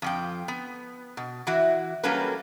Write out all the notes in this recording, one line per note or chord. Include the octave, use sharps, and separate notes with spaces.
F2 F3 G5
B3
B2
E3 E4 F#4
F#3 G3 A#3 C#4 A4 B4